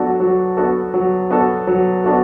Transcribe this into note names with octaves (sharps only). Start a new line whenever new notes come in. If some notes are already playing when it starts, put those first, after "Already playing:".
Already playing: F#3 B3 D4 F#4 A4
F#3
B3 D4 F#4 A4
F#3
B3 D4 F#4 A4
F#3
B3 D4 F#4 A4